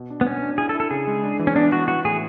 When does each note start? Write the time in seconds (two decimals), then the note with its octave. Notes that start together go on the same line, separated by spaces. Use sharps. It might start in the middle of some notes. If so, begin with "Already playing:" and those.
Already playing: B2
0.10 D4
0.21 B3
0.26 B2 C#4
0.42 D4
0.58 E4 G#4
0.69 A4
0.75 E4
0.80 A4
0.91 C#3 G#4
1.07 G#3
1.23 D4
1.39 E3
1.47 C#4
1.56 B3 D4
1.72 E3 F#4
1.88 E3 F#4
2.05 A2 G#4